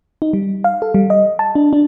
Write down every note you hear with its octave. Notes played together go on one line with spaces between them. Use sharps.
D#4
G3
F5
A4
G3
D#5
A5
D4
D4